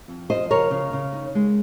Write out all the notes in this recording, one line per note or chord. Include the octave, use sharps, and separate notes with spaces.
F2
F3 C5 D#5
C#3 A#4 C#5
C#3
C#3
D#4
G#3